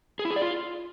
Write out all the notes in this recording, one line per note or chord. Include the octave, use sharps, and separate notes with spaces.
G#4
E4
G#4
D5
F4